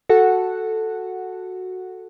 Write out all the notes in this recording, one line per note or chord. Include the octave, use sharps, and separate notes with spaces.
F#4 A4 F#5